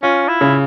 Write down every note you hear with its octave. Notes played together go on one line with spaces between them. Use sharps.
C#4 F4
E4
C#3